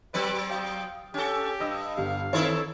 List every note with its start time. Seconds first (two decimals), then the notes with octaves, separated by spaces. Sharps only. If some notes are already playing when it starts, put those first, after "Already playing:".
0.14 F#3 C4 B4 D5
0.50 F5 G5 D#6
1.14 C#4 G4 A4
1.60 G2 D#5 E6
1.97 G1 G4 F5
2.33 D#3 C4 D#4 E4 A4 C#5